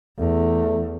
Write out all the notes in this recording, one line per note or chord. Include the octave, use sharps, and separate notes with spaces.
E2 A3